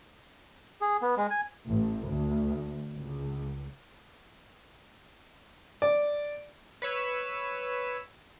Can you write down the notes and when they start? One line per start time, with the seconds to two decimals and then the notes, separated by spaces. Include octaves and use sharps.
0.81 G#4
1.02 B3
1.17 G#3
1.30 G#5
1.67 A1
2.08 D2
2.94 C#2
5.82 D5
6.82 B4 C#5 E6 B6